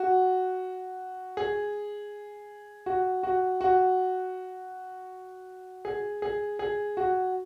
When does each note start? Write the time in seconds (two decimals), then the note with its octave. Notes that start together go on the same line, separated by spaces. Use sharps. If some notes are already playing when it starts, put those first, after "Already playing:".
Already playing: F#4
1.37 G#4
2.86 F#4
3.23 F#4
3.61 F#4
5.85 G#4
6.22 G#4
6.59 G#4
6.97 F#4